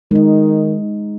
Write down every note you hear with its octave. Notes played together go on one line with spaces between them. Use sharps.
D#3 G#3 D#4